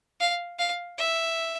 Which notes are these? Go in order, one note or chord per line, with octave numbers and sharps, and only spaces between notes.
F5
F5
E5